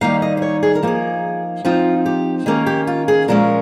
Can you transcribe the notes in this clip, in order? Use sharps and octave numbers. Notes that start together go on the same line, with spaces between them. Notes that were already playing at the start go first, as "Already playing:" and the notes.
D#3 G3 A#3 D#4 F5
D#5
C5
C#5
G#4
A#4
F3 A#3 D#4 G#4
F3 C4 D#4 F4
G4
D#3 A#3 C#4 G#4
G4
F4
G#4
A#2 F3 G#3 C#4 A#4